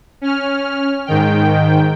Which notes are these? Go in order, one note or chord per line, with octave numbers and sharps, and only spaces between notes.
C#4 F6
G#2 D#3 G5